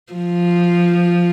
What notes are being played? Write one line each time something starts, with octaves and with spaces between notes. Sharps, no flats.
F3